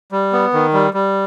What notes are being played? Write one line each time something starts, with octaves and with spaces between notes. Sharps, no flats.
G3
B3
D#3
G3
G3